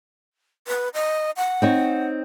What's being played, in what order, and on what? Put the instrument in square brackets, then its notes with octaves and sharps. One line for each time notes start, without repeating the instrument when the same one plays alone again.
[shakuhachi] B4
D#5
F#5
[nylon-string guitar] C4 D#4 C#5